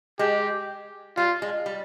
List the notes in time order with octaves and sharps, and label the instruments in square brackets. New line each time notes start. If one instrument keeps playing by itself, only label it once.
[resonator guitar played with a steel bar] G#3 [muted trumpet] G4
[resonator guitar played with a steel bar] G3 [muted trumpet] F4
[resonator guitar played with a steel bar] G#3
G3